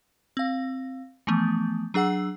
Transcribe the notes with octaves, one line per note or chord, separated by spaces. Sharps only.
C4 F5
E3 F3 A3 B3
F#3 D4 G#4 F#5 E6